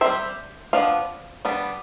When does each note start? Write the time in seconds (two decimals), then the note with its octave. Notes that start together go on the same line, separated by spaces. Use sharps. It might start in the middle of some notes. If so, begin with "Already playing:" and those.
0.01 G3 C4 C5 E5
0.73 F3 B3 D4 F5
1.45 G3 B3 D4